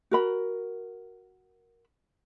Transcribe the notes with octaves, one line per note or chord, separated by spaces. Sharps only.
F#4 A#4 B5